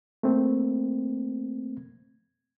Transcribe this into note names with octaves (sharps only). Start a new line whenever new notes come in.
A3 A#3 C4